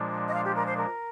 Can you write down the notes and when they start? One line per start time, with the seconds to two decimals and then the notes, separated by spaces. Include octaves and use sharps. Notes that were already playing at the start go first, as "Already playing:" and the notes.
Already playing: A#2 F3 G#3 D4
0.28 D#5
0.34 F5
0.45 G4
0.56 A#4
0.67 C5
0.77 A#4